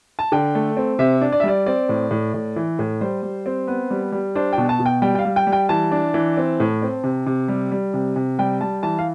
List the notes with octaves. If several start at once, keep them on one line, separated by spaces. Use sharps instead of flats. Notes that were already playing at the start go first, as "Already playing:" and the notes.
A5
D3 G5
A3
C4
C3 E5
D4
D5
E5
G3 D5
C4 D5
A2
A2
A2
E3
A2
G3 C5
G3
C4
B3
G3
G3
D4 C5
G5
B2
A5
B2
G5
G3 G5
G5
F5
G3
G5
G3
G5
E3 A5
D4
E3
C4
A2
C4
C3
C3
G3
G3
C3
C3
G3 G5
G3 A5
E3 A5
F5